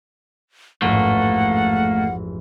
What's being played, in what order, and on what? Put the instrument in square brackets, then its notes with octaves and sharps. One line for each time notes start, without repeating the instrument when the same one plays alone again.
[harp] A1 F2 G#2 [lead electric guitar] A3 A#3 [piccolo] F#5